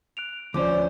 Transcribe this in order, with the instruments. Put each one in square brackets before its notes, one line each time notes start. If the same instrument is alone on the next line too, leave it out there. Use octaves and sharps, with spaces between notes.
[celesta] F#6 D7 F7
[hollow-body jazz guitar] D2 F3 C#4 [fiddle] C5 [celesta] D5 D6